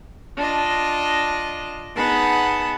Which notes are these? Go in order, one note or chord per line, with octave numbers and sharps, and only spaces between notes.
D4 F4 D#5
B3 D#4 G#4 B4 F#5 A5